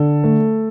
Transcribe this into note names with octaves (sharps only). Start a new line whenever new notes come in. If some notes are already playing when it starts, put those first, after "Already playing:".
Already playing: D3 A4
A3